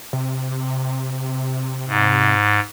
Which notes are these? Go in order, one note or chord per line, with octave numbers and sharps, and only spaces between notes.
C3
G#2